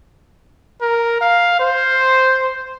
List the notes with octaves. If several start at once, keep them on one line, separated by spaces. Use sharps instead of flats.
A#4
F5
C5